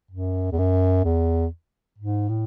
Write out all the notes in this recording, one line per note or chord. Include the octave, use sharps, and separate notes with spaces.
F#2
E2
F#2
E2
G#2
A2